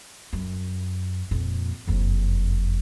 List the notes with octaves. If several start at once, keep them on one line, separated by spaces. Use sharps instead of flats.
F#2
F2 A#2
F#1 F2